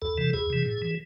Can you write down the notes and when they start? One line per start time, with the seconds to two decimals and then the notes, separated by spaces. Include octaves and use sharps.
0.02 E2 A4
0.18 C3 E3
0.34 E2 G#4
0.50 C3 E3
0.65 A2
0.82 E3